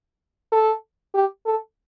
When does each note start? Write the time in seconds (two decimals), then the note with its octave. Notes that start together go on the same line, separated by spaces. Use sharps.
0.52 A4
1.14 G4
1.46 A4